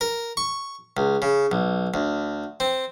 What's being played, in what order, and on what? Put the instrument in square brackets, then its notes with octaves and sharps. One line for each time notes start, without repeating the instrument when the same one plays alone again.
[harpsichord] A#4
C#6
C#2
C#3
B1
D2
C4